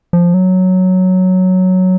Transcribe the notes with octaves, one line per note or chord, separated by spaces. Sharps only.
F3
F#3